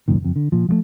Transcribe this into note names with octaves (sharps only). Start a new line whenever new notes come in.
C2 F#2 A#2 D#3
F#1 F2
D3
A#2 F3
F3 F#3 A3